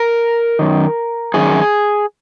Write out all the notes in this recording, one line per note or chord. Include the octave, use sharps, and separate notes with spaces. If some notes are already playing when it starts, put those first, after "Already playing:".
Already playing: A#4
F#2 D#3
F#2 D#3 G#4